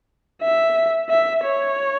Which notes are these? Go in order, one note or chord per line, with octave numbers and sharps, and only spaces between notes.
E5
E5
C#5